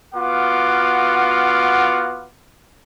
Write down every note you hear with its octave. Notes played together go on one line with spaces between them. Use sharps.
B3 F4 F#4 F5 F#5 D6